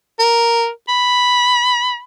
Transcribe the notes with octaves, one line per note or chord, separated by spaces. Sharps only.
A#4
B5